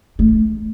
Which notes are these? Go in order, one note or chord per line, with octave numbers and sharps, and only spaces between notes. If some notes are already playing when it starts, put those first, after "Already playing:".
A3